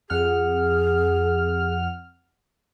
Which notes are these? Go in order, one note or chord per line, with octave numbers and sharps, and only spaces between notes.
F2 G#4 F#5 F6